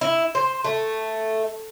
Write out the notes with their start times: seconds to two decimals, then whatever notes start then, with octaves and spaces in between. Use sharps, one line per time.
0.01 E4
0.35 C5
0.64 A3